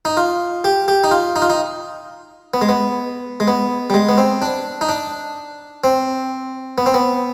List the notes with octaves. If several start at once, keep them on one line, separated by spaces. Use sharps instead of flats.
D#4
F4
G4
G4
D#4
F4
D#4
F4
D#4
B3
G#3
B3
G#3
B3
G3
G#3
B3
C4
D4
D#4
D4
C4
B3
C4
B3